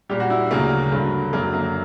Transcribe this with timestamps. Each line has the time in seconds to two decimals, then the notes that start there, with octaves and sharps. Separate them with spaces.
0.09 A#2 G3 G4
0.20 F#4
0.30 E4
0.41 D4
0.51 D2 C#3 F#3 A#3
0.92 G2 D3 F#3
1.33 F#2 D3 F#3 A#3
1.54 A#3